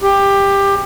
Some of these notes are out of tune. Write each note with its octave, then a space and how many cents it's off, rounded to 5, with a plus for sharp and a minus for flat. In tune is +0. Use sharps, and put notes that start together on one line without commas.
G4 +15